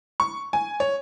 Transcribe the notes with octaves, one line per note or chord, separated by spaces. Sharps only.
C#6
G#5
C#5